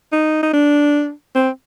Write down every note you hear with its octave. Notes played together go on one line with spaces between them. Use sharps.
D#4
D#4
D4
C4